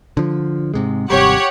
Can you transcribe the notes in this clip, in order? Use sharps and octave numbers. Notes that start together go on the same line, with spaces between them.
D3 F3
G#2 C3 G#3
G#1 C3 G3 G4 C#5 F#5